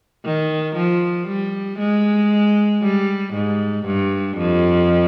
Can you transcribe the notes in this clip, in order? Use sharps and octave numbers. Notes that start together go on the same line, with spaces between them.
D#3
F3
G3
G#3
G3
G#2
G2
F2